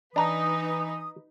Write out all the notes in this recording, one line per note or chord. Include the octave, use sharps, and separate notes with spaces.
E3 D4 D#4 B4 A#5 D#6